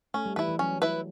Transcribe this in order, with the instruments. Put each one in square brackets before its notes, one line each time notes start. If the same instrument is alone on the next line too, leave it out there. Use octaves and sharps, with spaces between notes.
[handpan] A3 [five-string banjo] C#4
[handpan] G3
[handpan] E3 [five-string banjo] E4 B4
[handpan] E3
[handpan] F#3 [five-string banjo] C#4
[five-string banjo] E4 B4